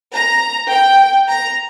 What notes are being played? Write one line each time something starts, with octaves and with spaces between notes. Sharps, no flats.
A#5
G5
A#5